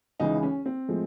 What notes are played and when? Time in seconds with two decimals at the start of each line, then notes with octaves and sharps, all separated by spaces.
0.20 C#2 C#3 E3 D#4
0.43 C#4
0.66 C4
0.88 A2 F3 G#3